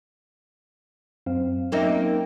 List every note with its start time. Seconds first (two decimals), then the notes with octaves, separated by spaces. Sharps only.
1.26 F#2 C4 F5
1.72 F#3 A#3 C4 C#4 D#4 E5